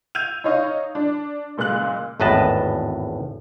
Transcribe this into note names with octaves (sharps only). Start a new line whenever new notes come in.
E6 G6 G#6 D#7 F7
D#4 C#5 D#5 F5
D4
F#1 A#2 G#3 F#6 F#7
G#1 E2 A2 B4 D#5 A5